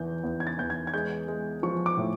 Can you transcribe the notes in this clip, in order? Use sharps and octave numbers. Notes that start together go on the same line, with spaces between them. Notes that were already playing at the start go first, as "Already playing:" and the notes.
Already playing: E2 E3 G6
E2
G#6
A6
E2 G6
G#6
G#6
G#3 G6
G#3
F3 C#6
D6
A2